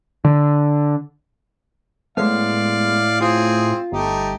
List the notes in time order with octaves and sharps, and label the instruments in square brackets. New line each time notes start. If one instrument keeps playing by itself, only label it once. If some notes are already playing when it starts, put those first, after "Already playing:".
[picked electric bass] D3
[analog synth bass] A2 [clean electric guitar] G#3 B3 [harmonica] D5 F5
[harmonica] C4 G#4 [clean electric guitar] F4
[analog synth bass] G1 [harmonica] A3 D#4 G4